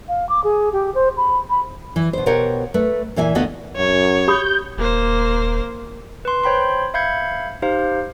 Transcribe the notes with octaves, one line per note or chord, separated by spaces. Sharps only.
F5
D6
G#4
G4
C5
B5
B5
E3
B2 C5
B2 G4 A#4 C5 C#5 F#5
A3 B4
A#2 E3 E5 F5 G#5
D2 B3 D#5 F5 A5
F#2 C#5
G4 B5 D#6 G6
D#1 A#3 C5
B4 C6
C5 C#5 G5 B5 C6
E5 F5 B5 G6 G#6 C#7
D#4 G4 C5 F5